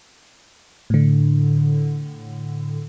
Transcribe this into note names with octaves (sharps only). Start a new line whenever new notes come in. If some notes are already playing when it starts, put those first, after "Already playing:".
A2 D3